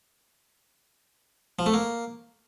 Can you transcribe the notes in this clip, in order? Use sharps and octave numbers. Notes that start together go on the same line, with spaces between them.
F3
A3
A#3